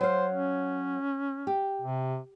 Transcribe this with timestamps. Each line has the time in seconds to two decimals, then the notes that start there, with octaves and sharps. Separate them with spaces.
0.01 F#3 C5 F5
0.32 C#4
1.47 G4
1.82 C3